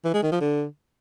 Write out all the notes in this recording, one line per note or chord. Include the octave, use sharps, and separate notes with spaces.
E3
G#3
D#3
F3
D3